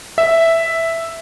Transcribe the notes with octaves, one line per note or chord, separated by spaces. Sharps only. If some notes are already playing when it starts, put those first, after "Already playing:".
E5